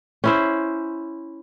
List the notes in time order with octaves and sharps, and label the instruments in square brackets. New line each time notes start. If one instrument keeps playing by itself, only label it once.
[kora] C#4 E4 C5